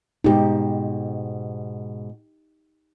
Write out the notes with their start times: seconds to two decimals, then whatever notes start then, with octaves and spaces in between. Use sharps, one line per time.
0.24 G#2 B2 D#4 G4